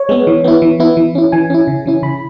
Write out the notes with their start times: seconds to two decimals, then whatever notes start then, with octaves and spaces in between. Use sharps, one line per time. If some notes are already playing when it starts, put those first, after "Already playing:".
Already playing: C#5
0.09 G#3 B3
0.27 E3
0.44 B3 E4
0.62 E3
0.80 B3 E4
0.97 E3
1.15 C#4 E4
1.32 E3 G#5
1.50 C#4 E4
1.67 C#3
1.86 E3 C#4 E4
2.03 C#3 B5